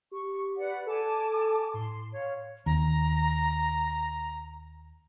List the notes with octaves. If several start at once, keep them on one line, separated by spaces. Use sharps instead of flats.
G4 C#6
B4 D5 F#5
A4 G#5 A5 D6
A2 C6
C#5 F5
D#2 A#5